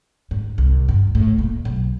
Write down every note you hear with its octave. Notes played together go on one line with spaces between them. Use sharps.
G#2
C2
G2
A2
A#2
B1